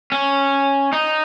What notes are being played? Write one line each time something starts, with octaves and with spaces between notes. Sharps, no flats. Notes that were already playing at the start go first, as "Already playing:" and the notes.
C#4
D#4